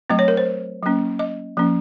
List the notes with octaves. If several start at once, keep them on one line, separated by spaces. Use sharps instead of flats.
F#3 A3 C4 D#5
C#5
A#4
C5
F#3 A#3 C#4
D#5
F3 A#3 C#4